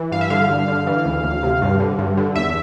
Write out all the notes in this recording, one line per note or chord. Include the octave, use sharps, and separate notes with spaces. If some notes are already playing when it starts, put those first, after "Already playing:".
Already playing: E3
G2 F5
E5
D3 F5
G2
D3
E3
D2
D2
C3
G2
D3
G2
D3
E2 E5